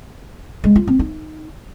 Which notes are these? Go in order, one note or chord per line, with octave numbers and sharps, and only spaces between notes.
G#3
F4
C4
D#4